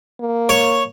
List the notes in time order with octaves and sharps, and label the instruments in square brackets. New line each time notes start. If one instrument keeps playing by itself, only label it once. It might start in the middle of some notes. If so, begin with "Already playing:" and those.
[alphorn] A#3
[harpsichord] C#5